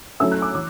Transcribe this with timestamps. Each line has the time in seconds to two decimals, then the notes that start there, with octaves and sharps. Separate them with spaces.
0.20 F#3 A3 C#4 E4 E6
0.31 F#6
0.42 D6
0.54 E3 D6